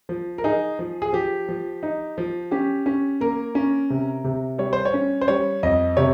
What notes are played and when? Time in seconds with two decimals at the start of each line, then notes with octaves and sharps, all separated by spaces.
0.09 F3
0.38 A#4
0.44 D#4 G#4
0.79 F3
1.02 G#4
1.13 F3 G4
1.48 F3
1.83 D#4
2.18 F3
2.51 C#4 G4
2.86 C#4
3.21 A#3 A#4
3.55 C#4
3.90 C3
4.24 C3
4.58 G3 C#5
4.73 C5
4.85 C#5
4.94 C#4
5.21 C5
5.28 G3 C#5
5.63 F2 D#5
5.97 C3 C#5